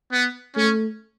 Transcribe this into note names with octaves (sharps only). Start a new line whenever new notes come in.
B3
A3 C#4